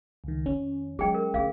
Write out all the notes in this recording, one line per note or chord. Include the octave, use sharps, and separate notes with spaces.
C#2 D#3
F2 D#3 C#4
F#3 G#3 G#4 G5
A#4
D2 G#4 F5